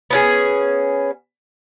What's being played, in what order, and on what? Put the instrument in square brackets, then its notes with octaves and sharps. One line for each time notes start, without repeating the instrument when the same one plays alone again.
[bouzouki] B3 C#4 G#4